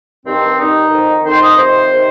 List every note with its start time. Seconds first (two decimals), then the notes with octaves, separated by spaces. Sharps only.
0.25 G2 D#3 C4
0.58 G2 D#3 D#4
0.91 F2 D#3
1.24 F2 D#3 C5
1.41 D#5
1.57 F2 C3 D#3 C5
1.92 C3 D#3